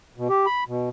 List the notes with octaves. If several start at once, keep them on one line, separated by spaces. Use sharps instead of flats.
B2
G4
B5
B2